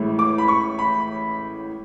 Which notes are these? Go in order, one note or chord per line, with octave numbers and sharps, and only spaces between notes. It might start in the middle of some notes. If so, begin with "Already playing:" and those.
Already playing: A1 A2 G#3
D6
B5
C#6
B5